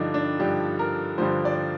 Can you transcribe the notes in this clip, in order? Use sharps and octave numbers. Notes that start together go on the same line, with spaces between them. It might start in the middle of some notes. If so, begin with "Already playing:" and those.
Already playing: G2 D3 F3 D4 D#4
D4
G2 D3 F3 G4
A#4
G2 D3 F3 C5
D5